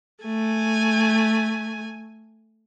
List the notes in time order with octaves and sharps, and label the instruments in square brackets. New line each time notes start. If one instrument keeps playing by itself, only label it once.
[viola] A3 G#5